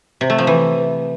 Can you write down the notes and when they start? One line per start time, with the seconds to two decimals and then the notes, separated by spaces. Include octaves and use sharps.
0.21 C3
0.30 A3
0.38 F3
0.47 E3